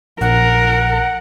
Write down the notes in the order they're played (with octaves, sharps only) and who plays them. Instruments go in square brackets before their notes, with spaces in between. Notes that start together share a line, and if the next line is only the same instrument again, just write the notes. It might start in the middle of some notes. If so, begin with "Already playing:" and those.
[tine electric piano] A#1 [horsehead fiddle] A#4 [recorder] F#5